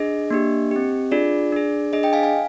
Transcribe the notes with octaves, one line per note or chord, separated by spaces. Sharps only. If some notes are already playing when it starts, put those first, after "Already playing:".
Already playing: D4 G#4 D#5
A#3 D4 G4
C4 G4
D4 F4 G#4 D5
D4 G#4
D4 G#4 D#5
D#5 G5
F5 G#5
F5 G#5